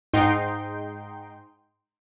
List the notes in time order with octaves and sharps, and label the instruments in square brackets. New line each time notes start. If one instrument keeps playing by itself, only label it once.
[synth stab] G#2 D#4 G5 C6